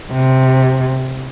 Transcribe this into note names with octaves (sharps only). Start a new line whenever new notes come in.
C3